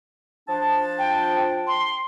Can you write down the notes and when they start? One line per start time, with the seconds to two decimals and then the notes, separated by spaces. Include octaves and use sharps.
0.49 F3 D4 A5
0.99 G5
1.67 C6